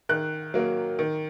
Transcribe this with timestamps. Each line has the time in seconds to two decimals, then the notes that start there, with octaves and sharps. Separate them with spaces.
0.09 D#3 F#6
0.54 F#3 A#3
0.99 D#3